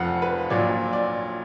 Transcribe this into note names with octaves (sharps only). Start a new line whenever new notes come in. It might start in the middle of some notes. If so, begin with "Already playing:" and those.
Already playing: F1 F2 F3 F5 F#5
B4
A#1 A#2 F#3 D5
D5